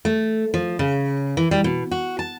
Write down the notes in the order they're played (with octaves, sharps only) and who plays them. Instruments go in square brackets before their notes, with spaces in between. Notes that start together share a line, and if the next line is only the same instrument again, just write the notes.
[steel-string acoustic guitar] A3
F3
C#3
E3
G3
B2
F#4
A5